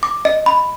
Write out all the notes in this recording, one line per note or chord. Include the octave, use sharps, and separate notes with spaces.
D6
D#5
B5